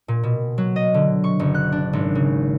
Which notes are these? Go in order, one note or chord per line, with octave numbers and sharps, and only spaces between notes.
A#2
B2
F#3
D#5
D3
C#6
F#1
F#6
D4
G#1
C#3